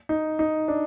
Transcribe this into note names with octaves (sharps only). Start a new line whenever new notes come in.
D#4
D#4
D4